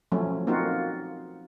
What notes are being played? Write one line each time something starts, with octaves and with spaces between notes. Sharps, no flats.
F3 F#3 A3 C#4
A#3 C4 D#4 F4 F#4